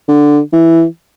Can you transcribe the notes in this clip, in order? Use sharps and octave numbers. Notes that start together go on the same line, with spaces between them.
D3
E3